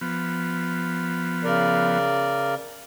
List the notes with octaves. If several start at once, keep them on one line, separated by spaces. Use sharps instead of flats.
F3 B3
C#3 A#4 D5